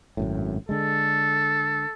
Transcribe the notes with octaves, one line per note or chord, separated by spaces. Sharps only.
G#1 F#2 A2
D3 G#3 A4